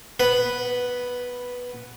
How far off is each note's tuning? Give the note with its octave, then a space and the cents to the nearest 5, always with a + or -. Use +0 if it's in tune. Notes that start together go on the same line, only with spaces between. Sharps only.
B3 -5 B4 +0